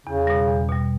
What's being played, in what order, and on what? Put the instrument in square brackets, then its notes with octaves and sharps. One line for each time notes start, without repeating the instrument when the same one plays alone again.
[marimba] E2 [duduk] C#3
[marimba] B2 G3
E2
B2 G3